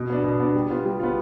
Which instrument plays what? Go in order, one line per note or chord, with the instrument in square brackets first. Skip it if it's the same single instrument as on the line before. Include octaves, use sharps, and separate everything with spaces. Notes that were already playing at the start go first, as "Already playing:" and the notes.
Already playing: [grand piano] B2
B3 D4
B2
B3 D4
G3
B3 F4
G3
B3 F4